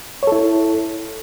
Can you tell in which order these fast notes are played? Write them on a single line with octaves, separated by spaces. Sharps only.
C#5 A4 E4